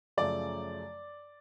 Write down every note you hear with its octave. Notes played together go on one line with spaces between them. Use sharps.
F#2 C#3 F3 A3 D5